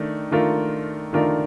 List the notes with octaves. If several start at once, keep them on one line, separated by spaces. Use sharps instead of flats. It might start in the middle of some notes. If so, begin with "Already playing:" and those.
Already playing: D#3 A3 D4
D#3 A3 D4 F4 A#4
D#3 A3 D4 F4 A#4